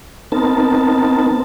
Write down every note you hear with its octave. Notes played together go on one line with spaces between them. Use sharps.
B3 C4 D#4 A#4 A5